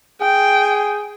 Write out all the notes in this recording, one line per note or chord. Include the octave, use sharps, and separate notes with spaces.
G#4 G5